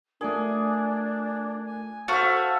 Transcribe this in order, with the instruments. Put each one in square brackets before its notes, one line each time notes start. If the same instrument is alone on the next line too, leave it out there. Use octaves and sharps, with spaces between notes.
[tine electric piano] A3 F4 A#4 [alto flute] D4 [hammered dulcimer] G#4
[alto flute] G#5
[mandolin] F#4 F5 [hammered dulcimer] A4 E5 [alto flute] C5 [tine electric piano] A6